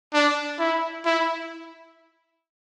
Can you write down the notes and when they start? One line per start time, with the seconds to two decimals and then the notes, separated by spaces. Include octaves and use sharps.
0.14 D4
0.59 E4
1.05 E4